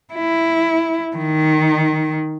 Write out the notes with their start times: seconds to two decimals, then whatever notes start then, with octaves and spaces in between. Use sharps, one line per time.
0.14 E4
1.17 D#3